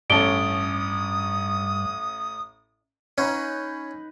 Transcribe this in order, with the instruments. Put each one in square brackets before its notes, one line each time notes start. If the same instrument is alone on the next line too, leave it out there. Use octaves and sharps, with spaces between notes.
[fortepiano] A1 C#4 A4 [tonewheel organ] G2 [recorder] D#6 [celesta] D7 G7
[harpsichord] C#4 [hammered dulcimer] D#4 B4 F#5